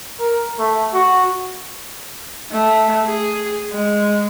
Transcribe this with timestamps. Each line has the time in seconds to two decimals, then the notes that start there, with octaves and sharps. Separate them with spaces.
0.20 A#4
0.59 A3
0.93 F#4
2.52 A3
3.05 G#4
3.71 G#3